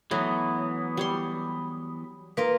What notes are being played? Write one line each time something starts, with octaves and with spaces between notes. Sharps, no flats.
E3 F#3 A3 B3 D#6
G3 C#5 C6
A#3 F4 A#4 B4